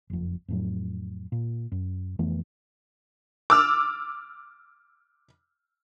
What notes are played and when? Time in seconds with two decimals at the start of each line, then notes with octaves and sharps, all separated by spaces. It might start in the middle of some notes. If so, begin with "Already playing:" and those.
0.10 F#1 F2
0.48 F2 A2 F#3
1.32 A#2
1.72 F#2
2.19 F2 E3 A3 B3
3.50 D6 E6 F6